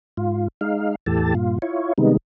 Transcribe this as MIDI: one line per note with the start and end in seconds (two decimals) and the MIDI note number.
0.17 0.48 44
0.17 0.48 65
0.61 0.95 56
0.61 0.95 63
0.61 0.95 77
1.06 1.34 40
1.06 1.34 45
1.06 1.34 52
1.06 1.34 67
1.06 1.34 69
1.06 1.34 81
1.35 1.58 43
1.35 1.58 46
1.35 1.58 65
1.62 1.93 64
1.62 1.93 65
1.62 1.93 73
1.98 2.17 48
1.98 2.17 51
1.98 2.17 55
1.98 2.17 56
1.98 2.17 59
1.98 2.17 63